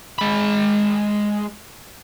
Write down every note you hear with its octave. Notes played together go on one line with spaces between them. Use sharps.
G#3 B5